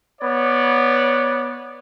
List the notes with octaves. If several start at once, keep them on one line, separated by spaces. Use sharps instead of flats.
B3 C#5 D5